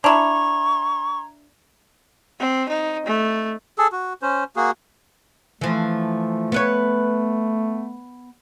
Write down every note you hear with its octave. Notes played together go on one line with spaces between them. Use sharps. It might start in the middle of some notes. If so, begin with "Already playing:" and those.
D4 E4 A#5 C#6 G#6 F7
C4
D#4
A3
G#4 A4
F#4
C#4 C5
A#3 F#4 G#4
E3 F3 A3
B3 B4 C#5